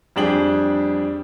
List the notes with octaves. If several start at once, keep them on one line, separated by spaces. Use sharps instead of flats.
F2 G3 D4 G#4 G5 F#7